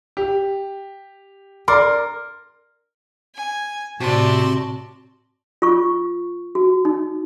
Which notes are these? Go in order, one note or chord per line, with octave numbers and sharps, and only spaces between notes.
G4
A#4 D5 C6 D6
G#5
A2 C3 F#4 D5 A5 C6
F4 C#6
F#4
D#4